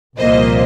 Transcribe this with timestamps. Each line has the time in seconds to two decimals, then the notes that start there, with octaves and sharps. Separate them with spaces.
0.18 C2 A#2 F3 A#3 C5 D#5